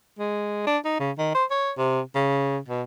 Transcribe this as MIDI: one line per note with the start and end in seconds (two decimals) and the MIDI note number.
0.19 0.63 56
0.67 0.78 62
0.85 0.98 63
1.00 1.11 49
1.18 1.33 51
1.35 1.45 72
1.51 1.71 73
1.78 2.01 48
2.15 2.58 49
2.68 2.83 47